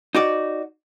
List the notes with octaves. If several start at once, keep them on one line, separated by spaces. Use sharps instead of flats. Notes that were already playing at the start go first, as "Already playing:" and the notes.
D#4 F#4 D5